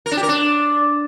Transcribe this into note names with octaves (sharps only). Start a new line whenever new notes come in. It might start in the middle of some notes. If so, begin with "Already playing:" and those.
A#4
D4
G4
A#4
D4